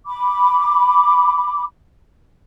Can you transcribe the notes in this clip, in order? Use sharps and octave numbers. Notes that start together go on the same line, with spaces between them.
B5 D6